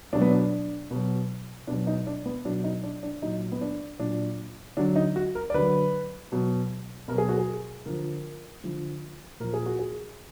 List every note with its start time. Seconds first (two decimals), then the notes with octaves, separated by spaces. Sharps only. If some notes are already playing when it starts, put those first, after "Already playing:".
0.13 B2 F#3 D4
0.22 B3
0.30 D4
0.91 B2 F#3
1.67 B2 F#3 D4
1.87 D#4
2.07 D4
2.26 B3
2.45 B2 F#3 D4
2.64 D#4
2.83 D4
3.03 D4
3.22 A#2 F#3 D#4
3.52 B3
3.61 D4
3.99 A#2 F#3 D4
4.77 D3 F#3 D4
4.96 D#4
5.16 F#4
5.35 A#4
5.50 D5
5.54 D3 F#3 B4
6.32 B2 F#3
7.08 B2 F#3 A#4
7.18 G#4
7.29 F#4
7.38 G#4
7.86 D3 F3 A#4
8.64 D3 F3
9.40 A#2 F3 A#4
9.54 G#4
9.66 F#4
9.79 G#4